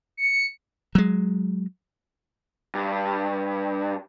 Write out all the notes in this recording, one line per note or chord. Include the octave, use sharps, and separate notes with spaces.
C#7
F#3 G#3
G2